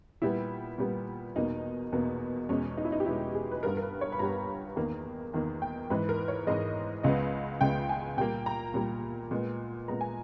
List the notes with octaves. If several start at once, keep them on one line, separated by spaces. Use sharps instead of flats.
A#2 G3 B3 E4
A#2 G3 B3
E2 B2 A#3 D#4
E2 B2 A#3
E2 B2 G#3 C#4
D#4
E4
D#4
G4
E2 B2 G#3 E4
G#4
B4
G2 G3 B3 A#4
A#4
B4
C#5
B5
G2 G3 B3 A#5
E2 D#3 A#3
E2 D#3 A#3
G5
G#2 E3 G#3 B4
A#4
C#5
G#2 E3 G#3 D#5
C#2 C#3 G#3 B3 D#5
C#2 C#3 G#3 B3 G5
G#5
A#2 G3 A#3 G5
A#5
A#2 G3 A#3
A#2 G#3 B3
A#2 G#3 B3 A#5
G#5